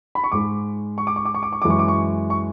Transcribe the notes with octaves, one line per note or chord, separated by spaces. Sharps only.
B5
C#6
G#2 G#3 D6
C#6
D6
C#6
D6
C#6
D6
C#6
F#2 E3 G#3 D6
C#6
D6
C#6
C#6